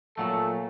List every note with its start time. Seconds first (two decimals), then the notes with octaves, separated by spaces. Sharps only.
0.17 A#2 F#3 A3 A4